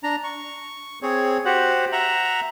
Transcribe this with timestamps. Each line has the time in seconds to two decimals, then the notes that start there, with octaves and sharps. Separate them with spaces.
0.03 D4 A#5
0.24 C#6
1.02 C4 G#4 C#5
1.45 F#4 G4 C5 F#5
1.92 E5 F#5 A#5